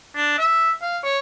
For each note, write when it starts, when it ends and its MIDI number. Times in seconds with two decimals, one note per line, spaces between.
0.16 0.37 62
0.38 0.71 76
0.82 0.98 77
1.04 1.19 73